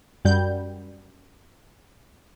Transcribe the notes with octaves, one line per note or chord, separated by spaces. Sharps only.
F#2 G3 G6